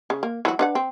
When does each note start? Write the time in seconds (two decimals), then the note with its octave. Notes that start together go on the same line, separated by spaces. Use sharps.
0.10 C#3
0.23 A#3
0.45 E3 F#3 F#4
0.59 D4 B4 F#5
0.75 C4